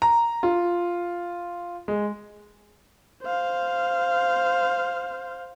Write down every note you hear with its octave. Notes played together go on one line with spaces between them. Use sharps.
A#5
F4
G#3
C5 F5